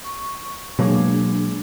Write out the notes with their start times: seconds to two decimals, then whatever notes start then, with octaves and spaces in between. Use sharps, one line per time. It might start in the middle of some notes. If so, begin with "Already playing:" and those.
0.04 C#6
0.79 B2 F#3 G#3 A#3 D4 G#4